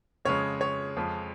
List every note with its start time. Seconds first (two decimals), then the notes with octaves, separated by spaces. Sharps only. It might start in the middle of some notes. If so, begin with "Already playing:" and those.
0.25 F2 C#3 G#3 C#5
0.61 C#5
0.97 F2 F3 G#3